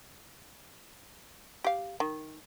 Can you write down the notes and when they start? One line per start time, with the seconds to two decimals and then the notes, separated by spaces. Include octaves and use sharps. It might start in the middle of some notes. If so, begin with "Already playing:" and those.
1.64 G4 F5
2.00 D#3